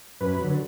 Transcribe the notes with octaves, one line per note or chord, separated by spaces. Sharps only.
F#2 B4
D3 F#3